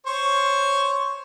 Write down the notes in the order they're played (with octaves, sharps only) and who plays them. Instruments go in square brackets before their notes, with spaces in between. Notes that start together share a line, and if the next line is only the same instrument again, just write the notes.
[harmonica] C5 C#5 C#6